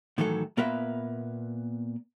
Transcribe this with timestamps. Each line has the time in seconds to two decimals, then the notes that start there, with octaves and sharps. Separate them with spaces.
0.18 A2 D#3 E3 F#3 A4
0.57 A#2 B3 A#4 B4 E5